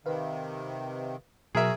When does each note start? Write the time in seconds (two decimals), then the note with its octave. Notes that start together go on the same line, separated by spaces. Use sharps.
0.06 C3 D#3 B4 F5
1.55 B2 F#3 F#4 G#4 A#4 E5